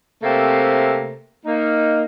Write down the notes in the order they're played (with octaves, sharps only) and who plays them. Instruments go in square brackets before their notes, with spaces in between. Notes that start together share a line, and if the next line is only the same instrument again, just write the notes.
[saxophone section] C3 A3 A#3 C4 A4
A#3 D#4